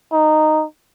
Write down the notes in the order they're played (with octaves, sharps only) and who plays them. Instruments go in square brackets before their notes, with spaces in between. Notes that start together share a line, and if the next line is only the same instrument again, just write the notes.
[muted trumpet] D#4